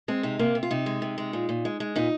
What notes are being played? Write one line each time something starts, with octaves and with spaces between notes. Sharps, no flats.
G#3 C4
C3 D#4
C3 A#3
C3
F4
C3 D#4
G#3
C3
G#3
A#2
A#2
G#3
G#3
A#2 D#4